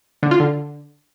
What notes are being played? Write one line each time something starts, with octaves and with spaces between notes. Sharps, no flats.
D3
F4
D3